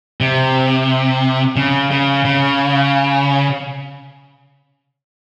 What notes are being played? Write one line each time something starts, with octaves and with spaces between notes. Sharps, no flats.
C3
C#3
C#3
C#3